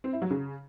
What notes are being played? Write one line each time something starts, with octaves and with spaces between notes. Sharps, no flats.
C4
E4
F#3
C#3